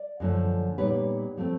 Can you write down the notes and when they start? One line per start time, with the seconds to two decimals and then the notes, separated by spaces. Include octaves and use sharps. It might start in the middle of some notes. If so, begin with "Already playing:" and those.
Already playing: D5
0.20 F#2 D3 F3 A3
0.78 A#2 G3 B3 D#4 B4 C#5
1.37 F3 A3 C4